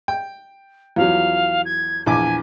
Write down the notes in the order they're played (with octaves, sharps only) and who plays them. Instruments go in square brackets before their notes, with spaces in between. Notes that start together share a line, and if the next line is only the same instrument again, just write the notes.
[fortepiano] G5
[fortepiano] E2 F3 F#3 [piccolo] F5
[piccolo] G#6
[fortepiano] A#1 E2 D6 [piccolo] G#5